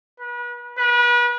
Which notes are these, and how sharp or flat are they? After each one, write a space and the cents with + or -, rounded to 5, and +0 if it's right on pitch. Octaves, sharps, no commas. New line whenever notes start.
B4 -35
B4 -35